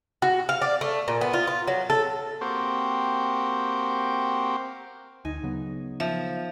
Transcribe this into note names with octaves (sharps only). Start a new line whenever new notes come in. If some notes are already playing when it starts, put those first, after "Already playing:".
F#4
F5
D5
A3
A#2
B3
F4
F4
F#3
A4
A#3 C4 F#4 G4 C5
D2 D#4 G#5
C#3 F#3 B3
F3 E5